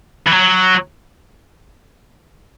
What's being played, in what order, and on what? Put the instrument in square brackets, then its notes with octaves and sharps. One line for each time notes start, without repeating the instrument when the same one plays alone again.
[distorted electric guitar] E3
F#3